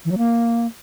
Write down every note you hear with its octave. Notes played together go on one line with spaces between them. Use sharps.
E3
F#3
A#3